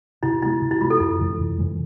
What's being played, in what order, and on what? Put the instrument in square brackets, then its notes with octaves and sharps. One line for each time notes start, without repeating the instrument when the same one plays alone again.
[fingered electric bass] C3 [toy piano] E4
[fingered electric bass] G#3 B3 [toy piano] E4
[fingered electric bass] C3
[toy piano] E4
[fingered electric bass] G#3 B3 [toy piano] F4
[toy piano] A4
[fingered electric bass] F2 [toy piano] E4
[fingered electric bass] C3 E3 G#3
F2
C3 E3 G#3